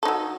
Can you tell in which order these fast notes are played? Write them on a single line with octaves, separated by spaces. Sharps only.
A4 D#4 F#3